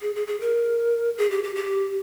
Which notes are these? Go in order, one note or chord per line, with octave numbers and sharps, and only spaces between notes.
G#4
G#4
G#4
A#4
G#4
G4
G4
G4